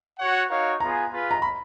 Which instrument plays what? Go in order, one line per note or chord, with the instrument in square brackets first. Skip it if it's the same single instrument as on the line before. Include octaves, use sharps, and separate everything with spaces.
[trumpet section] F#4 C#5 F#5
D#4 F#4 A#4 C#5 F5
[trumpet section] B3 F4 G#4 [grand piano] A#5
[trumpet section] F4 G#4 B4 F5
[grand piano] A#5
B5